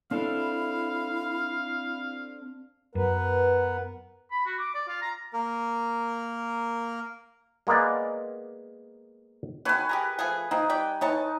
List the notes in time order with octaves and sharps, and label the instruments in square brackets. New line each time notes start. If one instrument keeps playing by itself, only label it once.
[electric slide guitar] C4 D4 A4 [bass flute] E4 [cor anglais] F5
[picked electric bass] F#2 [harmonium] B3 A#4 B4
[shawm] B5
F#4
D6
D5
F4
A#5
[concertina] A#3 A#4
[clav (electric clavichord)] G#3 A#3 B3 A#4 D5
[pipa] D#3 F#3 [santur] B4 G#5 C#6
[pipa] G4 G#4 A#4
F3 A3 G#4
[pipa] F3 C4 [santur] D#4
[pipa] G3 D5 G5
[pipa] E3 C#5 A5 [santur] D#4